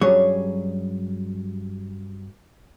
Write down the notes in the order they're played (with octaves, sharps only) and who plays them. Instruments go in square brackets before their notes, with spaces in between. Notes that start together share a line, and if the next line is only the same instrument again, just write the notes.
[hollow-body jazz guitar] G2 F#3 G3 C#4 G#4 C#5